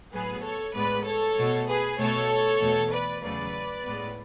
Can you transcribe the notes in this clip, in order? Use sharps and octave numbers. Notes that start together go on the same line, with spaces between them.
A2 F#3 B3 G#4 B4
A4 C#5
A2 G#3 B3 B4 D5
A4 C#5
B2 A3
G#4 B4
B2 A3 A4 C#5
E2 B2 A3
B4 D5
E2 C#3 F#3 A3 B4 D5
A2 G#3 B3